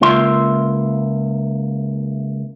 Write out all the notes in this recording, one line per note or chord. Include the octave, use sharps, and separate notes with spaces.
C#2 A#3 F4 E5 C6